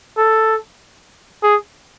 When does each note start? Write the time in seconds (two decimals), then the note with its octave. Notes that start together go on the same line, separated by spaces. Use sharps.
0.17 A4
1.43 G#4